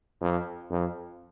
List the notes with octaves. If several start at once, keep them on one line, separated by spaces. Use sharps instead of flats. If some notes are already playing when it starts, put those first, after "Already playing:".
F2
F2